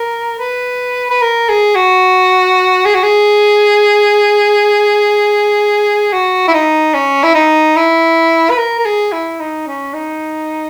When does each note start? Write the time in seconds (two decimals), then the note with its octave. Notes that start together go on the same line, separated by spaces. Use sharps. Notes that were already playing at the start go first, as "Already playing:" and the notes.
Already playing: A#4
0.39 B4
1.10 B4
1.22 A#4
1.49 G#4
1.75 F#4
2.86 G#4
2.95 F#4
3.03 G#4
6.13 F#4
6.48 E4
6.54 D#4
6.94 C#4
7.23 E4
7.35 D#4
7.76 E4
8.50 B4
8.58 A#4
8.79 A#4
8.85 G#4
9.12 E4
9.40 D#4
9.67 C#4
9.94 D#4